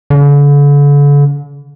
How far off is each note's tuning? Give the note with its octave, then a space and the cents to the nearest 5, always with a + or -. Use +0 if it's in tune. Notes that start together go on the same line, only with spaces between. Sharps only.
D3 -40